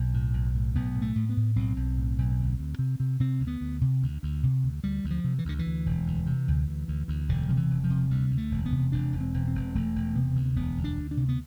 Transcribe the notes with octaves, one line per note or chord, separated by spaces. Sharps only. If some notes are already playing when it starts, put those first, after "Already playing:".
Already playing: B1 C4
A2
B1
A2
B1 B3
A2
A3
A2
B3
A2
B1 C4
B1
A2
B1
D2
D2
C3
C3
C3 C4
D2
B3
D2
C3
D2
D2
C3
D2
D2 G3
D2
F3
C3
E3
D2 D3
E3
D2
E1
D2
C3
D2
D2
D2
D2
E1 D3
C3 F3
E3
E1
F3
C3
D2 G3
D2
A3
E1
B3
C3
E1 D4
E1
C4
E1
C4
E1
E1 A3
E1
C3 B3
D2
E1 B3
D2
D4
D2
D4
C3
B3